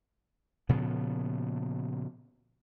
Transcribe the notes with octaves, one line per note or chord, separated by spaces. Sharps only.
A#2 C#3 F3 B3